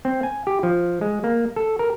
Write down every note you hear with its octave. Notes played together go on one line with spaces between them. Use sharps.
C4
G#5
G4
F3
G#3
A#3
A4
A#4